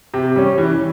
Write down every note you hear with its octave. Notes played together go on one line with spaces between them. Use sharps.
C3
G3 C#4
E3